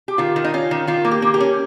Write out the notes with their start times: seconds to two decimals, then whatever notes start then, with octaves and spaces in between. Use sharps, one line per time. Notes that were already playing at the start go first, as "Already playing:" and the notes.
0.08 G4
0.18 D#3 F4
0.36 D#3
0.44 D#4
0.54 C#4 F4
0.71 D#3
0.87 D#3 F4
1.05 A#3
1.11 G4
1.22 A#3
1.34 G4
1.40 C#4